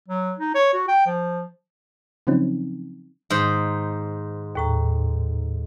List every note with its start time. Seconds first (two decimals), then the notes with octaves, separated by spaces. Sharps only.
0.08 F#3
0.39 D#4
0.54 C#5
0.73 F#4
0.88 G5
1.07 F3
2.27 C#3 F3 F#3 C4 C#4 D#4
3.30 G#2 D#3 C5
4.55 D#2 A2 A#5